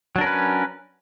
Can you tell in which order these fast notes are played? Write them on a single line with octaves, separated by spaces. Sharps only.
F#3 D4 A#4 C#4 B4